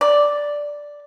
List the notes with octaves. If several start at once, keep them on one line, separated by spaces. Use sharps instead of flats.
D5